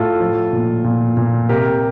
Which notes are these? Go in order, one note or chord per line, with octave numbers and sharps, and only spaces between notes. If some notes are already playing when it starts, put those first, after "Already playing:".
Already playing: A2 F4 A4
F3
A#2
A#2
A#2
C3 G4 A#4